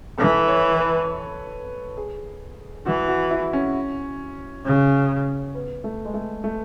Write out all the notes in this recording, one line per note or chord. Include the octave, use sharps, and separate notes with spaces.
E3 A4
C#5
B4
G#4
E3 F#4
F#4
E4
C#4
C#3
B3
A3
G#3
A3
A3